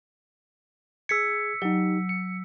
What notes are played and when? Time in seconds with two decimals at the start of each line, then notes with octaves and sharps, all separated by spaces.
1.09 G#4 E6 G#6 B6 C#7
1.62 F#3 D#4 G4
2.09 C#7